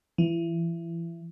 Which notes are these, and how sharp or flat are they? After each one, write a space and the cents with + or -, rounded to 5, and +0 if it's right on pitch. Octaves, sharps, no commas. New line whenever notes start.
E3 +30